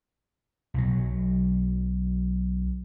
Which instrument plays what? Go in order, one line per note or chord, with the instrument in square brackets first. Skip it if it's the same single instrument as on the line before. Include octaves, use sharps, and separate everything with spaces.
[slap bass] B1 F#3